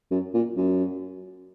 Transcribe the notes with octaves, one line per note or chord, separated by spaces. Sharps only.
F#2
A#2
F#2